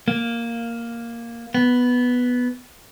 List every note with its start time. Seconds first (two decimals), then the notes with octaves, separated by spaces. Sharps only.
0.08 A#3
1.55 B3